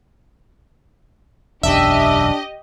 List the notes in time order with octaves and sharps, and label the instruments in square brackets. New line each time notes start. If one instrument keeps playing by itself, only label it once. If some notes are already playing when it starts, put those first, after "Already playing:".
[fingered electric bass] E1 B1 F#2 [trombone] D4 [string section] G4 D#5 [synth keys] E5